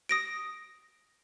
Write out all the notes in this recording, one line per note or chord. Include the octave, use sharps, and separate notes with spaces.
D#6 A#6 D7